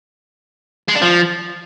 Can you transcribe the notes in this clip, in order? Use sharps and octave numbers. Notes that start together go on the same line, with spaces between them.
G#3
D4
F3